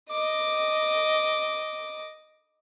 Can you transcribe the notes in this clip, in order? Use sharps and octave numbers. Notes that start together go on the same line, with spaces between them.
D#5 D6